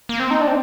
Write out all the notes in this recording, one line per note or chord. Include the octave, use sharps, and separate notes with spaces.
A#3
C4
D#4
D4
C4